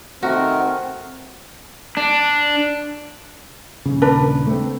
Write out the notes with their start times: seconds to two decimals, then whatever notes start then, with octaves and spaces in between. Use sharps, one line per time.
0.23 D#3 A3 C4 F#4 A#4
1.97 D4
3.86 D#1 C#3
4.02 D4 A#4 B4
4.47 A3 C4